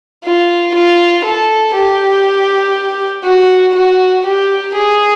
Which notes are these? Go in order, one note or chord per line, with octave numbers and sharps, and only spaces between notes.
F4
F4
A4
G4
F#4
F#4
G4
G#4